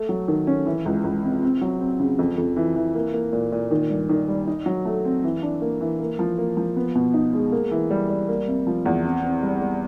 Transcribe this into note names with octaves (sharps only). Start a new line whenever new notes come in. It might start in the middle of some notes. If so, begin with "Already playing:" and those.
Already playing: A3
F#3
D#3
C#4
E3
C#2
C#2
C3
C4
F#3
C4
C#3
F2
F2
E3
E3
A#3
A#3
A#2
A#2
D#3
G2
D#3
G3
D#4
F#3
A3
C4
E3
D4
A#3
E3
A#3
F3
A#3
F3
B3
B2
D#4
G#3
A#3
E3
G3
G3
A#3
C3
F3
E2
C4
C4
G3
G3